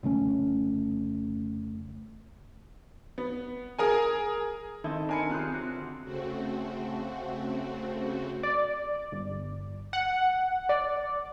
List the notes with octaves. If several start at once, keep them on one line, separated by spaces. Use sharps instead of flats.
F1 C#3 A3 C#4
B3
G#4 A#4 G#5
D#3 C4 D#4 E4 A4
D4 A#4 G#5 B5 C#7
C3 F#3 F4 G4 G#4 F5 F#6
D3 C4 F#4
C#3 A3 C4 F#4
D5
G1
F#5
D5